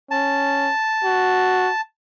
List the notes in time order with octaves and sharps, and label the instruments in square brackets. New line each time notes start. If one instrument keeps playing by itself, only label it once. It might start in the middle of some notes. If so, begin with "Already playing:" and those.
[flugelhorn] C#4 [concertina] A5
[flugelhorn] F#4